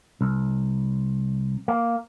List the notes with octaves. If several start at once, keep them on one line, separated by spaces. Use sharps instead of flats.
C2
A#3